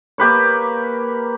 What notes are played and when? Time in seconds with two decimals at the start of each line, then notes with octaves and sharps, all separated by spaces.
0.18 A#3 G4 B4 C#5